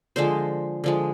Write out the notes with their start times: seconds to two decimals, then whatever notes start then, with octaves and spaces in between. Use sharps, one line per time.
0.16 D3 F3 G#3 C5
0.84 D3 F3 G#3